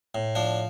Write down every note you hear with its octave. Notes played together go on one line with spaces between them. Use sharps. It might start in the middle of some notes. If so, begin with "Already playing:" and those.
A2
F3 D4